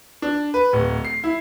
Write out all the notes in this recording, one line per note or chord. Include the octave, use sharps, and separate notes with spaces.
D4
B4
D1
C7
E4